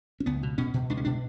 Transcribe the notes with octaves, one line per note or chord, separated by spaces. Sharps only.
C#4
C#2 B3
B2
B2 C#4
B2
C#2 D4
C#4
B2 D4